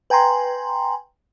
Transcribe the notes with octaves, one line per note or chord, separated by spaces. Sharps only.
B4 G5 G#5 A#5 C6